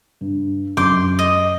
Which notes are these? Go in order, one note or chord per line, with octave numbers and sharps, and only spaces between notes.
G2
F#2 C6 D6 G6
D#5